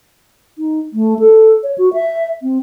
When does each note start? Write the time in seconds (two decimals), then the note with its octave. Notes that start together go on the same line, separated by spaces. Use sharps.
0.58 D#4
0.93 A3
1.19 A4
1.63 C#5
1.78 F#4
1.94 E5
2.42 C4